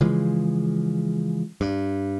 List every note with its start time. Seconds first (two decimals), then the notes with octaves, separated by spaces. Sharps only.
0.01 C#3 E3 F3 G#3
1.61 G2